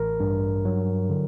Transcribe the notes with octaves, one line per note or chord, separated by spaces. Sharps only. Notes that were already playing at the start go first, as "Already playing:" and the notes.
Already playing: A1 A#4
G2
F#3
D3